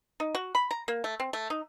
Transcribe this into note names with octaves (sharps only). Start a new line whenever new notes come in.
D#4
F#4
B5
A#5
A#3
A3
C4
A3
D#4